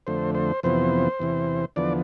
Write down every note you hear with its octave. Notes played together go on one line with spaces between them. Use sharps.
F2 D3 A3 C5
C5
F2 C3 E3 B3 C5
E2 C3 E3
E2 D3 F3 B3 D5